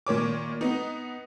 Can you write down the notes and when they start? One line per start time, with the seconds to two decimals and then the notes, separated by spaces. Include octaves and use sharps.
0.07 A#2 D#3 C#5 D6
0.61 B3 D#4